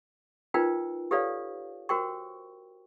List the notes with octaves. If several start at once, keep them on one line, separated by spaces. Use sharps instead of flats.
D#4 F4 A#4 B4 G5
G4 A4 B4 C#5 D5 F5
F#4 A#4 C5 G5 C#6